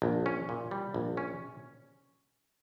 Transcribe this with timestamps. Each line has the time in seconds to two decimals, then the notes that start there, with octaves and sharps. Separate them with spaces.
0.02 A#1
0.26 C#4
0.49 A#2
0.71 G3
0.94 A#1
1.17 C#4